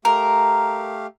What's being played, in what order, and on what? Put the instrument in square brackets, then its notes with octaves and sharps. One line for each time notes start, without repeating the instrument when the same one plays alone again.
[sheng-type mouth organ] A3 G4 F5 [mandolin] A#4 [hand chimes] A#5